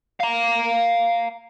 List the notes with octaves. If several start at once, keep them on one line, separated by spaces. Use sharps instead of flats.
F5 A#5